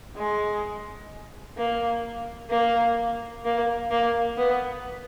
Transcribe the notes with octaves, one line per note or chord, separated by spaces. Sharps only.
G#3
A#3
A#3
A#3
A#3
B3